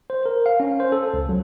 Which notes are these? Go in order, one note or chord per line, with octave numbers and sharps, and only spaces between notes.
C5
A#4
F5
C#4
C5
A4
C#2
F#3